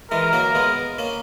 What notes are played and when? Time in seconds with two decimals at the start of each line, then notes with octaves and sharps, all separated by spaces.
0.11 E3 G#3 A#4
0.33 F#3 A#3
0.55 G#3 B3
0.99 A#3 C#4